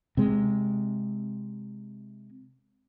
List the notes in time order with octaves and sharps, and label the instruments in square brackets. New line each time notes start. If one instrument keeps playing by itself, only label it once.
[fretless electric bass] C3 G#3